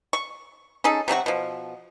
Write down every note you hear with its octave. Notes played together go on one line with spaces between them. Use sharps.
C#6
C#4 D#4 G#4 A4
C3 F#3 D4 F#4
B2 F3